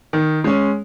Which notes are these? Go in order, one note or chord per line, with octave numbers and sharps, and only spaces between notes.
D#3
G#3 C#4